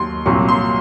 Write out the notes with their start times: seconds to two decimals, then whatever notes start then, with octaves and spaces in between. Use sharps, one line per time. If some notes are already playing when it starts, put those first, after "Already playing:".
Already playing: D#2 D#3 F#3 C6
0.26 C2 A#2 F#3 C#6
0.49 C6